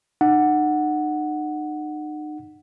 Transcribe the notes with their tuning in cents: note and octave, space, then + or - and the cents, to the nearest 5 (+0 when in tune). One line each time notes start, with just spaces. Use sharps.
D#4 -40 F#5 +0